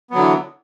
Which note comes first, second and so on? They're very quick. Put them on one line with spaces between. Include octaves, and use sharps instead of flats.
B3 F#3 D3 E3